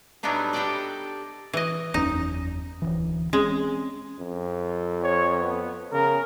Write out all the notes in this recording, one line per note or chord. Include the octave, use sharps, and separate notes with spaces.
A2 F#3 G3 B3 D4 D#4
D4 G4 A4 A#4 D5 D#5
E3 D#5
F#1 E2 C#4 D#4
D1 G#1 E3
G#3 C4 C#4
F2
C#5
B3
C#3 A#4